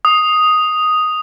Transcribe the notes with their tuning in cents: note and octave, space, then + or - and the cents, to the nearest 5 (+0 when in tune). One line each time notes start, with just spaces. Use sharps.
D#6 +0